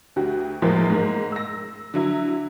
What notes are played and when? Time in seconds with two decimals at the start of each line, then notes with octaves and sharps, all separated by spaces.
0.16 D2 F#4 G4
0.62 E2 A2 E3 F3 G#3 A#3
0.90 G#2 A#3
1.32 E6 A#6
1.94 D3 F#3 E4